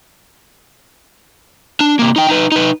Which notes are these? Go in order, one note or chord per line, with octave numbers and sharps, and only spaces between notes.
D4
C3 A#3
D#4 G5
D#4 B4
D#4 B4